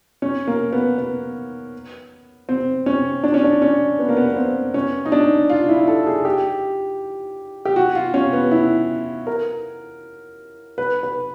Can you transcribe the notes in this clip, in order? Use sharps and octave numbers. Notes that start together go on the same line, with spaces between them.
C#4
A#3
B3
B3
C4
C#4
D4
C#4
D4
C#4
B3
A#3
B3
B3
C4
C#4
D#4
D4
F4
E4
A4
G#4
G4
G4
F#4
F4
C#4
B3
E4
A#4
B4
B4